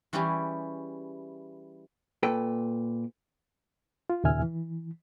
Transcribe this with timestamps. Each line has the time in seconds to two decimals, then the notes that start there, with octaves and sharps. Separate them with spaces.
0.13 E3 G3 C#4 E4 G4 G#4
2.23 A#2 A4 B4 G5
4.10 F4
4.24 D#2 A#2 C#3 E5 G#5 F6
4.42 E3